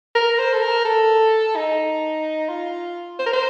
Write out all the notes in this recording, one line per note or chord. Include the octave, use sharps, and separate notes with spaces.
A#4
C5
A4
A#4
A4
D#4
F4
C5
A#4
C5